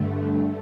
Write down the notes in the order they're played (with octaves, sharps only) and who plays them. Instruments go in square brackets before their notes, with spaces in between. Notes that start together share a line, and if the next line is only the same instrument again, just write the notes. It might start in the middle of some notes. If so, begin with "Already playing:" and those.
Already playing: [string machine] G2 D3 A3